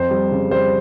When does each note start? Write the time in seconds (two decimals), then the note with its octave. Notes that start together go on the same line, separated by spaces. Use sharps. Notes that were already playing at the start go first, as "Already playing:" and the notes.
Already playing: F2 C5
0.11 G3
0.31 C#3
0.51 G3 C5